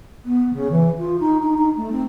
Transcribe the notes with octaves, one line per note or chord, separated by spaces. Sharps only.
B3
C#3
E3
F4
D#4
D#4
D#4
A3
C4